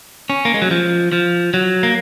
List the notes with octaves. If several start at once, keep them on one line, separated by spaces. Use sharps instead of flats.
C#4
A#3
G#3
F#3
F3
F3
F#3
A#3